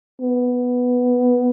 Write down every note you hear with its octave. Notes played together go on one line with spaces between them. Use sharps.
B3